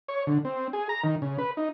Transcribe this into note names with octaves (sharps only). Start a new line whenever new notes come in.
C#5
D3
C4
G#4
A#5
D#3
C#3
B4
D#4